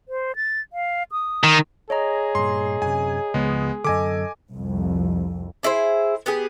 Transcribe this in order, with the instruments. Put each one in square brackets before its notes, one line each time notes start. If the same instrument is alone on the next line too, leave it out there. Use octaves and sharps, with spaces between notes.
[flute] C5
A6
F5
D#6
[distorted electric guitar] D#3
[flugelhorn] G#4 [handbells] C#5 D#5 A#5
[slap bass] G2 A#2 [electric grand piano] C6
[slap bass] F#2 C3 [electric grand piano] G#5
[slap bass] C#2 C#3 F3 [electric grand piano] G#3 B3
[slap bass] F#2 D3 [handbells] A4 D#5 [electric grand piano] G#5 D6
[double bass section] C2 F2
[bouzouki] D4 E4 G#4 C5
B3 G4 G#4